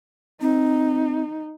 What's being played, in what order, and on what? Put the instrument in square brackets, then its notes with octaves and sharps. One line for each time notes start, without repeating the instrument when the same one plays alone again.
[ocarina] C4 [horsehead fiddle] D#4